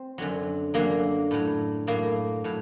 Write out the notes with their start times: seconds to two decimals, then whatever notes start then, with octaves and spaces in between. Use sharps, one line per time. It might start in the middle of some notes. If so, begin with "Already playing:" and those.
Already playing: C4
0.18 F#2 D3 F#3
0.74 F#2 D3 F#3 A#3
1.31 A2 F#3
1.87 A2 F#3 A#3
2.44 A2 F#3